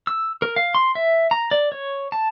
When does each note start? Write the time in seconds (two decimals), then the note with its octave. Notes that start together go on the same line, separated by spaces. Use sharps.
0.07 E6
0.42 A#4
0.56 F5
0.75 C6
0.95 E5
1.31 A#5
1.51 D5
1.72 C#5
2.12 A5